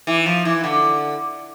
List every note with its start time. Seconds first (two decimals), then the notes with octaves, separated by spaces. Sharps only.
0.07 E3
0.26 F3
0.45 E3
0.64 D3